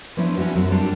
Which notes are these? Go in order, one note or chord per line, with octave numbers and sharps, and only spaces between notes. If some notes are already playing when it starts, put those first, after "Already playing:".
F3 B3 C#4 D4 E4
C#4 D4 E4 F#4
F#2 F#3 C4
G3 D4 F4 F#4